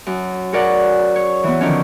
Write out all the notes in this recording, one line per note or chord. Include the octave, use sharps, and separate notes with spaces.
F#2
F#4 G#4 A#4 D5 F#5
C#5
E3 B3
D3 D#3 F3 C#4